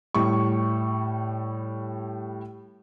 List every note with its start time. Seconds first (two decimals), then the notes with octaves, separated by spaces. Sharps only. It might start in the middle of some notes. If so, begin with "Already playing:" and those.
0.14 A2 G3 C#6